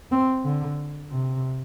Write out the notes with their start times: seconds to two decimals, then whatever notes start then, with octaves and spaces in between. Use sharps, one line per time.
0.12 C4
0.45 D3
1.12 C3